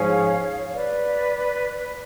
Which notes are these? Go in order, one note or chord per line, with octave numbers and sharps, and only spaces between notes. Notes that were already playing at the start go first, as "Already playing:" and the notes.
Already playing: G#2 F3 G#3 C#4 G#4 C#5 F5
C#5
B4 D5